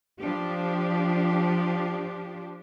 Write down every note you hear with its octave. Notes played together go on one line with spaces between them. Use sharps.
F3 D4 G4